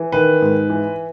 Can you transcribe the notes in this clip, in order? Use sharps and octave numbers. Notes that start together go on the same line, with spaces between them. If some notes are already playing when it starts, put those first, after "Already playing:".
Already playing: E3
D#3 B4
G#2
E3